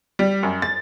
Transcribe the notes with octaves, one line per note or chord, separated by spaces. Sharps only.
G3
F#2
A6